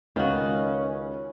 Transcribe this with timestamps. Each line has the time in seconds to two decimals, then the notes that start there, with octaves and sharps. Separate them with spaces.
0.16 C#2 D#3 C#4 F4 F#4 D#5 F5